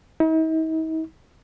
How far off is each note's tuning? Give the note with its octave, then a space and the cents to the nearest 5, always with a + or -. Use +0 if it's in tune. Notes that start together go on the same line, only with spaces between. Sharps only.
D#4 +45